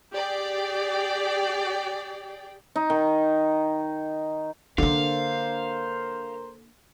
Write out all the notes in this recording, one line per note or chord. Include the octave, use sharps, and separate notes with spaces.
G4 G#4 D5 G5
D#4
D#3
D3 A#3 D4 A#4 C5 F5